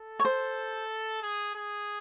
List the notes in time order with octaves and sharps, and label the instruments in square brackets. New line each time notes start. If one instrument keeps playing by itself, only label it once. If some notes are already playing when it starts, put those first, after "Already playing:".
Already playing: [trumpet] A4
[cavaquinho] C#5
C5
[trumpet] G#4
G#4